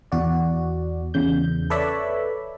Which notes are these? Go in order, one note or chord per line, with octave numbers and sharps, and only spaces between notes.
E2 F#4 D5
E2 C#3 G6
A4 B4 C#5 D5 E5 B5